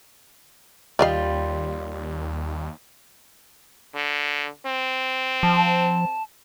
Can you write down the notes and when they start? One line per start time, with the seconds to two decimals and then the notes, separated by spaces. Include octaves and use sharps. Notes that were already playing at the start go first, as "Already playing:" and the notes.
0.99 D#2 G3 F4 D5 D#5 F5
3.95 D3
4.66 C4
5.43 F3 A5